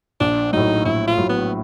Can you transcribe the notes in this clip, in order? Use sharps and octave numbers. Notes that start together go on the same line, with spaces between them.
A#1 D4
A2 F#3 D#4
A#1 E4
F4
A2 F#3
B3